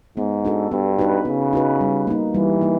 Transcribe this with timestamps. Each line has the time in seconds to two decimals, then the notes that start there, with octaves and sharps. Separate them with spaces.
0.17 G#2 B3
0.45 D4 F#4 A4
0.71 G2 B3
0.99 D#4 F#4 B4
1.25 C#3 B3
1.53 D#4 F#4 B4
1.81 G3
2.07 A#3 D#4
2.34 E3 G3
2.61 A#3 D#4